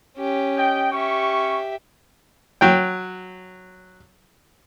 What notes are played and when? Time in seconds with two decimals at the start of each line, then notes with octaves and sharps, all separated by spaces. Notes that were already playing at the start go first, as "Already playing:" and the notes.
0.17 C#4 G4
0.57 D#5 G5
0.91 C#4 G4 E5 C#6
2.61 F#3 G5